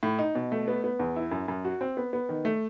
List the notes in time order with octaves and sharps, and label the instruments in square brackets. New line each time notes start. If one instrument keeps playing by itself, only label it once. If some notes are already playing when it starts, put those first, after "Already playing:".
[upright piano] A2
D#4
B2
A3
B3
B3
E2
E4
F#2
F#2
F#4
C4
B3
B3
D#3
A3